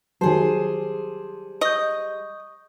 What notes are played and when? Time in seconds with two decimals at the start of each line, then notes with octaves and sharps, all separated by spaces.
0.21 D#3 F#3 G3 G#4 C5 A5
1.61 D#5 C#6 D#6 G6